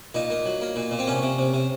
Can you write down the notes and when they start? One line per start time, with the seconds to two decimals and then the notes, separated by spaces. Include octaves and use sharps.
0.14 A#2 D#4
0.30 A#3
0.45 F#3
0.61 A#3
0.76 A#2
0.91 A#2
0.99 C4
1.07 C3 C#4
1.22 C3
1.38 C3
1.54 C3